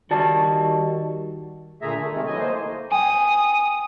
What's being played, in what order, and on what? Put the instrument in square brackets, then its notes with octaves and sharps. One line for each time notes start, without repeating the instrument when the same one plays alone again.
[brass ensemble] D#3 G3 [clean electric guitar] F#4 D5 A5
[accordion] A#2 D3 A3 G#4 E5 A#5
A3
C3 D#3 G#3 A3
E3 F#3 A3 D#5 G#5
A3 A#3 C5
[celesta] G5 G#5 [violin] D#6